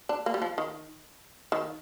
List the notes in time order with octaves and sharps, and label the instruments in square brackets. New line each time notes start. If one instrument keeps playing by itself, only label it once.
[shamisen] D4
A#3
G3
F3
D#3
D#3